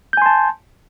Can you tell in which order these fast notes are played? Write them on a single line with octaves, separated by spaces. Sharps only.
G6 G#5 C6 A5